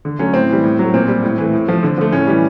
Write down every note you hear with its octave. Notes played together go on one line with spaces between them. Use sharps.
D3
F#3 A3 C#4
A2 C4
E3 G3
A2
F#3 A3
A#2 C4
G3
A2
E3 A3
A2
F3 A3
D3
F3 A3
A2 C#4
E3 G3